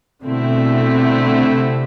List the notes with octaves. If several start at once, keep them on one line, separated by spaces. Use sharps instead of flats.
B2 D3 A3 C4 E4
C3